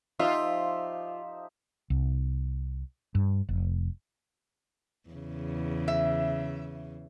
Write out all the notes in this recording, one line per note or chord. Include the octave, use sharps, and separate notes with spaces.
F3 D#4 F4 G4 E5
C2
G2
F1
E2 C#3
E5